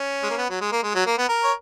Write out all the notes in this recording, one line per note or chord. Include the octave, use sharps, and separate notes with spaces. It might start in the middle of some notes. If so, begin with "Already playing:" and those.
Already playing: C#4
G#3
A#3
B3
F#3
G#3
A#3
G#3
F#3
A#3
B3
A#4
C#5